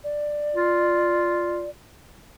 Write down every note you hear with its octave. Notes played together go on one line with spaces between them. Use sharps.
D5
F4